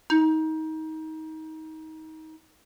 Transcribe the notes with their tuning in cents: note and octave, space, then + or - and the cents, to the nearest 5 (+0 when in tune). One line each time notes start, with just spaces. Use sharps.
D#4 +25